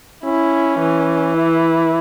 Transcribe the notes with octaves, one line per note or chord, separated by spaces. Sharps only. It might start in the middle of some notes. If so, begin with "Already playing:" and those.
C#4 E4
E3
E4